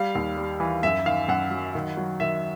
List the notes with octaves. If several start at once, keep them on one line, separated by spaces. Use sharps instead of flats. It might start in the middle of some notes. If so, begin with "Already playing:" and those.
Already playing: G3 F5
D#2
G3
E3
F#2 E5
D#3 F5
F#2 F#5
F#3
D#3
F#3
D#3 E5